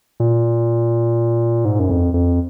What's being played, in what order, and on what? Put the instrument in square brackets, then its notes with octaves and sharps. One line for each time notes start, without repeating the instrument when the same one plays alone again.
[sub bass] A#2
G#2
F#2
F2
F2